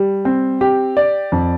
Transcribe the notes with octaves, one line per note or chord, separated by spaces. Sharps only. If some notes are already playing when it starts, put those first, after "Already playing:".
Already playing: G3
C4
G4
D5
F2